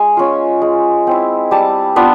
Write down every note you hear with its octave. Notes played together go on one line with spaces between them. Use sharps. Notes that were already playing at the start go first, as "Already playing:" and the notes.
Already playing: G#3 G#5
C#4 F4
G#3
C4 E4
G3 A5
B3 D4 F4